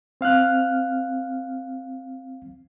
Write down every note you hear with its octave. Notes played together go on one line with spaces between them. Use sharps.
C4 F5 F6 F#6